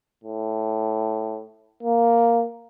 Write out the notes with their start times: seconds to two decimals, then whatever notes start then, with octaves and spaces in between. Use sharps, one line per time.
0.24 A2
1.83 A#3